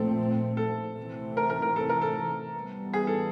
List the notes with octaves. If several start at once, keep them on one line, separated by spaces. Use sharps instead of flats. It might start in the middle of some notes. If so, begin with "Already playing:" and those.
Already playing: A#2 F3 A3 C4 A4
A4
C3 E3 A3 C4
A#4
A#4
A#4
A4
A#4
A4
E3 G3 B3
G#4
A4